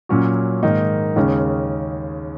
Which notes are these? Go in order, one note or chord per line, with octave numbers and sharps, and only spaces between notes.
A#2 F#3 C#4 F#4
G#2 D#3 A#3 D#4
D#2 C#3 G#3 C#4